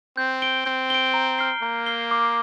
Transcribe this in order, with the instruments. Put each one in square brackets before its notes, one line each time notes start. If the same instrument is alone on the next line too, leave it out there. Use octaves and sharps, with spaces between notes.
[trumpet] C4 [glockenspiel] G6
[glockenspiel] D7 G7
[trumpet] C4 [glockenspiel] G6
[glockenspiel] D7 G7
A#5
F6 C7 G7
[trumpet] A#3 [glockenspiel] A#5
[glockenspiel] F6 C7 G7
D6